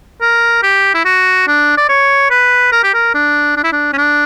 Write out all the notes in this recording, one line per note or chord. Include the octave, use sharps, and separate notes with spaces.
A#4
G4
E4
F#4
D4
D5
C#5
B4
A#4
G4
A#4
D4
D4
E4
D4
C#4
D4